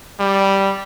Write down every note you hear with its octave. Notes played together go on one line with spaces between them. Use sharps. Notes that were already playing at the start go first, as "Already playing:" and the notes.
G3